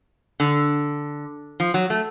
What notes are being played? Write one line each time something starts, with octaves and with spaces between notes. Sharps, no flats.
D3
F3
F#3
A3